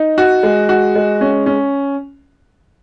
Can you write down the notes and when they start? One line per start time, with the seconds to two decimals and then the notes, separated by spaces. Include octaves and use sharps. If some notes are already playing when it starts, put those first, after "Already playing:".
Already playing: D#4
0.18 F#4
0.43 G#3
0.69 F#4
0.95 G#3
1.21 C#4
1.46 C#4